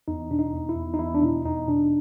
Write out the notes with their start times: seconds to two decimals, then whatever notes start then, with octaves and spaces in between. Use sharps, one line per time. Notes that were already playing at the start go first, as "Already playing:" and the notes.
0.08 E2 D#4
0.30 B2 D4
0.39 D#4
0.53 E2
0.69 E4
0.76 E2
0.94 D#4
0.99 E2 E4
1.15 D4
1.22 B2 D#4
1.45 E2 D#4
1.67 B2 D4